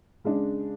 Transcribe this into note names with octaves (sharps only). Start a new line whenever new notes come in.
C#3 G#3 D4